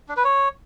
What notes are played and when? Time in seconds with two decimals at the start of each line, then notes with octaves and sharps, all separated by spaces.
0.09 D4
0.17 B4
0.25 C#5